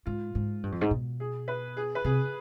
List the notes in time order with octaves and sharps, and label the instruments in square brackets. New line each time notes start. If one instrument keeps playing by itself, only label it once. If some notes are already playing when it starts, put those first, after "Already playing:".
[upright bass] G#2 [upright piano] F4
[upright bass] G#2
G2
F2
G#2
B2
[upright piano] G#4
B4
G#4
B4
[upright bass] C3 [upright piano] G#4